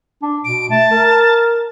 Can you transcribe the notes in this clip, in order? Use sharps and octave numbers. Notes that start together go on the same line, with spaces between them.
D4
B2 D7
A3 A5
A#4